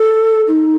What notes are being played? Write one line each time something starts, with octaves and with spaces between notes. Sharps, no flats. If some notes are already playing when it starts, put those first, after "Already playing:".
Already playing: A4
D#4